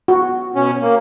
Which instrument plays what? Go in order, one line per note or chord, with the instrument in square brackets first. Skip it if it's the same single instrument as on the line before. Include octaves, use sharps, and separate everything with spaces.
[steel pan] F#4
[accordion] B2 C#4
A#3